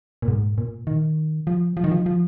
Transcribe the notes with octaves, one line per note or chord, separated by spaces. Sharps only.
A#2
G#2
A#2
D#3
F3
F3
D#3
F3
F3